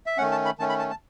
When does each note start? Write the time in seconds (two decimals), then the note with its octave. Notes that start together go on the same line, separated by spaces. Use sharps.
0.06 E5
0.18 D#3 A3 C#4 F#5
0.31 A5
0.45 B5
0.59 D#3 A3 C#4 A5
0.69 B5
0.79 A5
0.90 A5